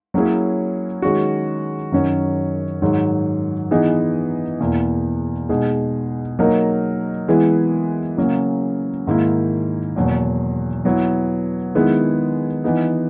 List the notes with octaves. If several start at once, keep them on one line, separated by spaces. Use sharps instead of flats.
F#3 A#3 C#4 E4 G#4
D#3 G#3 C#4 F#4
F#2 D#3 F#3 C#4
G#2 D#3 F#3
E3 B3 D#4 G#4
E2 B2 A#3 E4
B2 G#3 D#4 G#4
F#3 A#3 D#4 A#4
E3 G#3 B3 E4
C#3 F#3 A#3
G#2 D#3 A#3 E4
E2 B2 F#3 A#3
F#3 B3 E4
D#3 G#3 B3 E4
E3 B3 D#4